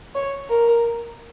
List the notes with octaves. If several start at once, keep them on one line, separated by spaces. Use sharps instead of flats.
C#5
A#4